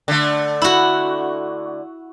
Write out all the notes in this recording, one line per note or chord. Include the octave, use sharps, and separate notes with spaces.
D3 A3
E4 F#4